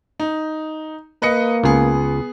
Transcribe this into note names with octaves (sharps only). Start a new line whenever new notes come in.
D#4
A#3 B4 D#5 C#7
C#2 B3 G#4